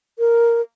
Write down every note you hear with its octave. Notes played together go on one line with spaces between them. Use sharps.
A#4